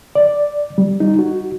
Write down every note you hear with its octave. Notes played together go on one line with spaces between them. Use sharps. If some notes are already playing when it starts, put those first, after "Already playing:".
D5
G3
D#4
F#4